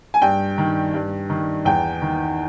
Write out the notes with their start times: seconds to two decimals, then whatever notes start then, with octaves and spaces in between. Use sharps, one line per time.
0.14 G#5
0.22 G2 G5
0.58 D#3
0.94 G2
1.30 D#3
1.65 E2 G5
2.02 D#3